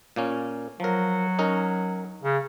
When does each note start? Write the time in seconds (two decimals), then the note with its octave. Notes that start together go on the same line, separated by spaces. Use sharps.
0.16 A#2 A#3 C#4
0.80 F3 F#3 A#4
1.39 C#4 D#4 A#4
2.22 C#3